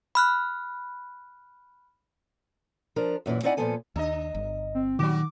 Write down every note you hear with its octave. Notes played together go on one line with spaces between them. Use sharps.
B5 F6 F#6
F3 D4 A#4
F#2 A#2 D3 E3
C4 D#4 E4 D5 F#5 G#5
A#2 D#3 F3 B3 A4 G#5
D#2 D4 D#5
G1
C4
A#2 D#3 F#3 G3 F#4 D6